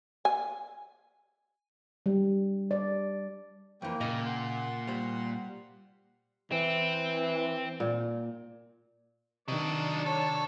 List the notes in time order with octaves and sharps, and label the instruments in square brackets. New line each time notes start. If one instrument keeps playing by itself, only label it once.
[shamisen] G#5
[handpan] G3
D5
[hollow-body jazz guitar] F2 E3 [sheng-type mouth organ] A#3 G5
[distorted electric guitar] A#2 [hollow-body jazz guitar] C#3 A#4 D#5
[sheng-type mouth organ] F#5 C6
[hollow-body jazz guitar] G3 C5
[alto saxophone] E3 [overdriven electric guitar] C4
[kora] A#2
[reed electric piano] C3 D#3 [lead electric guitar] F#3 D#5 [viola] D4 A5
[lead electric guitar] A4 [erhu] C#5